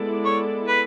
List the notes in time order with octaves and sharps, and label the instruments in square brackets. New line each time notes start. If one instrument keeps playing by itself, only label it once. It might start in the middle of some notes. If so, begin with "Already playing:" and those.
Already playing: [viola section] G#3 B3 E4 A4 D5
[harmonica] C#5
B4